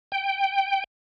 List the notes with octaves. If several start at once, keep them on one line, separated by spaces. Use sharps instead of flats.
G5